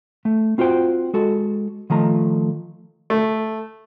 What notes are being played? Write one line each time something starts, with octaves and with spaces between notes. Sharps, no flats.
A3
C4 F4 F#4 C5 G5
G#3 F#4 A4
D#3 F3 A3 A#5
A3